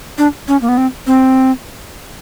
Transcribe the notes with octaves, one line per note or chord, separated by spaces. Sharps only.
D4
C#4
A#3
B3
C4
C4